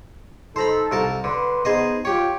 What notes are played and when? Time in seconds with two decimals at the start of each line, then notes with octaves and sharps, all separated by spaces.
0.56 D#4 A4 C5 A#5 B5
0.91 C2 A#4 A5
1.24 D3 B4 C6
1.65 B3 D#4 G#4 C5 D#5
2.05 F4 G4 C#5 G5